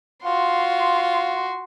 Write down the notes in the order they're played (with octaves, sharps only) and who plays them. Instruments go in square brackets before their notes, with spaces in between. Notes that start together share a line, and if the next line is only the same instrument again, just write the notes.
[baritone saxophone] F4 [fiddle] F#4 C6